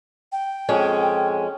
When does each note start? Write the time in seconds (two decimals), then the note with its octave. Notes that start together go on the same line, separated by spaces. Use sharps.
0.32 G5
0.69 F2 G#3 C#4